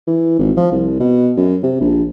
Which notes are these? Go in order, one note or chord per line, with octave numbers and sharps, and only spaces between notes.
E3
G#1
F3
C2
B2
F#2
C3
A#1